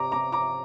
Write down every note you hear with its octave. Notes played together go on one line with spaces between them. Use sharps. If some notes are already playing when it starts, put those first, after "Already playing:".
Already playing: C3 A#5 D6
C3 A#5 D6
A#5 D6